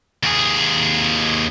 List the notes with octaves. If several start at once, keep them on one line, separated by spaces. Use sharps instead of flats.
D#2 G#4